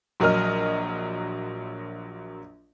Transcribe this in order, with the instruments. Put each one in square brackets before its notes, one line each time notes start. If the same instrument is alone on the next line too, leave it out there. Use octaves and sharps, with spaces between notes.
[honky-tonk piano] A#1 F#3 A#4 D#5 F6